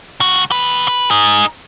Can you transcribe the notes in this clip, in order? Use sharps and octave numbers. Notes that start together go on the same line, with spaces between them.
C#2 F#4
D#2 B4
B4
D#4 G#4